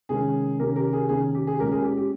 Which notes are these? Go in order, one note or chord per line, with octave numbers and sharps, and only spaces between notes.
C3 D#3 G#3 C#4 G#4
C3 D#3 A#3 C#4 G4 A#4
G4 A#4
G#4
C3 D#3 A#3 C#4 G#4
G4
G#4
A#2 G#3 C#4 G4 A#4
G#4
G4
G4